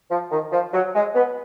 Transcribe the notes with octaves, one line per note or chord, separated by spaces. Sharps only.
F3
D#3
F3
F#3
G#3
B3